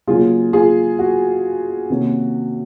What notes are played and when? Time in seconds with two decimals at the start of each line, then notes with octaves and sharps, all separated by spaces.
0.07 C#3 F#3 A#3 F4 G#4
0.53 F4 G#4
0.99 F#4
1.90 C3 D#3 A#3 C#4